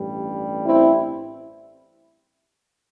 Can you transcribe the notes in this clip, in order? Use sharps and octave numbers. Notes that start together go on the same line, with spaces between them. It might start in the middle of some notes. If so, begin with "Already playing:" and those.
Already playing: A1 G2 G3
C4 E4